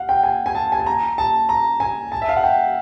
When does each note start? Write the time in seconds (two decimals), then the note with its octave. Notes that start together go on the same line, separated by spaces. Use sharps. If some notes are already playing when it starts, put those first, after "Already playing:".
Already playing: F5 F#5
0.09 G5
0.23 G#5
0.46 G#5
0.55 A5
0.72 G#5
0.80 A5
0.86 A#5
1.18 A5
1.49 A#5
1.80 G#5
2.12 A5
2.22 E5
2.29 F5
2.37 F#5
2.43 G5